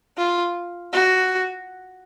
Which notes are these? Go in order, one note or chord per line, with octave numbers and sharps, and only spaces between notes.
F4
F#4